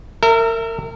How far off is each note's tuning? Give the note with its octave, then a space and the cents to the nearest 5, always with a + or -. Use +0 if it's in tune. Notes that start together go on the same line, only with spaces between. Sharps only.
A#4 -35 E5 +5